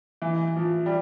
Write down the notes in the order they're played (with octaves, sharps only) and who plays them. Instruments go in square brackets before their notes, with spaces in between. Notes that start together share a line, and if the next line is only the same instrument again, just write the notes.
[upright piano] E3
F3
G3